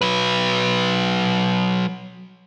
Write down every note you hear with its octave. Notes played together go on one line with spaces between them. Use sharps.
F#3 B4